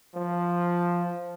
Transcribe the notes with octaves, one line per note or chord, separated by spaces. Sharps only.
F3